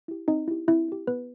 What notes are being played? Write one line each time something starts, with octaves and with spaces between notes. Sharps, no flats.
E4 G4
C4 D#4 D#5
E4 G4
C4 E4 E5
E4 G4
B3 B4